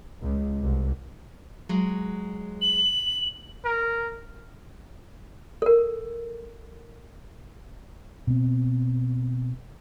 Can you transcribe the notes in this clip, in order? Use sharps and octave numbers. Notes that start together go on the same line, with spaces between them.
C#2
C2
F#3 G#3
F#7
A#4
A4 A#4
B2 C4